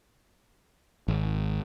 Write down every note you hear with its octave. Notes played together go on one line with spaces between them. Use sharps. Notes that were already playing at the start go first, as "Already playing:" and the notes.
G#1